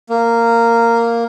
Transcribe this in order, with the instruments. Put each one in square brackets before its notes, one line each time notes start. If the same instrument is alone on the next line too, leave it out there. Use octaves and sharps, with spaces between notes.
[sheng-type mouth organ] A#3